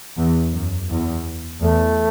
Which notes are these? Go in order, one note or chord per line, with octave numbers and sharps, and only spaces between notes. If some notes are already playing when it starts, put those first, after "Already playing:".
E2
F#2
E2
E2 A3